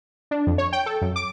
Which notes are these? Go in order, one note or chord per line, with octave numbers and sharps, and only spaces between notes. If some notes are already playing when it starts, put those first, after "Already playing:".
D4
F2
C#5
G5
A4
F#2
D6